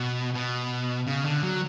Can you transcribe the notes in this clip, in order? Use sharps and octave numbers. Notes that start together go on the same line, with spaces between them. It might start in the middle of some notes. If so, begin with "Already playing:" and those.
Already playing: B2
B2
C#3
D3
F#3